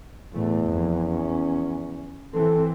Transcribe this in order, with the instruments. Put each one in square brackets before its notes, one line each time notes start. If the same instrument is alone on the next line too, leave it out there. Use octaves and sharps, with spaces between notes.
[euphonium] E2 [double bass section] A2 E3 A3
[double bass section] F2
C#4
[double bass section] E3 C4 [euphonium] A4